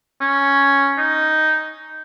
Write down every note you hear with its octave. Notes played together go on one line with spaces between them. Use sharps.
C#4
D#4